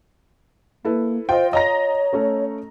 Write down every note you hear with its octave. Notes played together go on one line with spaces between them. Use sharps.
A#3 E4 A4 B4
F4 C5 D#5 G5
C#5 D#5 A#5 A#6
A3 C#4 A4